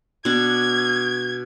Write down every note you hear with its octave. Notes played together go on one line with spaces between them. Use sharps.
B2 D4 G#6